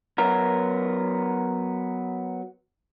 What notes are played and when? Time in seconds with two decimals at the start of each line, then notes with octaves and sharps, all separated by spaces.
0.18 F#3 B3 A#4